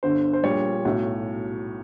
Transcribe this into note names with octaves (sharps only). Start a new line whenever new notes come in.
G1 G2 D3 C5
C5
A#1 A#2 G3 C#5
B1 A2 F#3